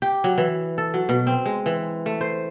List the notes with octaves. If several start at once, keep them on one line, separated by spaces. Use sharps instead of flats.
G4
F#3
E3
A4
F#3
B2
C4
G#3
E3
A3
C5